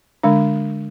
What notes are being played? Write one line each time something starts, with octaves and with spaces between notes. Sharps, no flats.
D3 G#3 D4